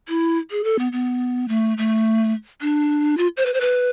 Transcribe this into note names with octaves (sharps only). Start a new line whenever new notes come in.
E4
G#4
A4
B3
B3
A3
A3
D4
F4
C5
B4
C5
B4